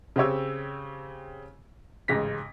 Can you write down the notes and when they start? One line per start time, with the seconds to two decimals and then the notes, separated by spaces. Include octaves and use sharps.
0.16 C#3 C4 G4 C#5 E6
2.08 A1 G#2 C#3 A#6 B6